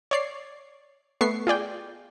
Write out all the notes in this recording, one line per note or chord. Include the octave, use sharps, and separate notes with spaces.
C#5 D5 C7
A3 B3 C#6 C7
F4 G#4 D5 G5